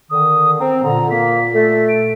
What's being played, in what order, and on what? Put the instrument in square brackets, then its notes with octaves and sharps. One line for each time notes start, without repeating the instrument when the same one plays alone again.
[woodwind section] D3 D#3 [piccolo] D#6
[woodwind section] C4 [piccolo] A#5
[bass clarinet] A#2 [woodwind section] D3 [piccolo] A#5
[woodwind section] A#3 [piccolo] B6
[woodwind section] A3 A4
[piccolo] D7